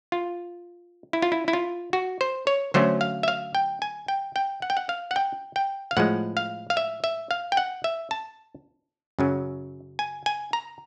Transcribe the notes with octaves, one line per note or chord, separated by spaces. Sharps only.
F4
E4
F4
E4
E4
F4
F#4
C5
C#5
D3 F#3 A3 C#4 C5
F5
E5
F5
G5
G#5
G5
G5
F#5
G5
F#5
F5
F#5
G5
G5
F5
A2 F3 G#3 F#5
F5
F5
E5
E5
F5
G5
F#5
E5
A5
F#2 C#3 F#3
G#5
G#5
A#5